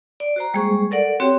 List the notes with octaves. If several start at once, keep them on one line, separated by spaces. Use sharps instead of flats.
D5
F#4 C5 A#5
G3 G#3 A#3 G#4 C5 C#6
A4 A#4 D5 F#5
C4 F#4 G4 C#5 G5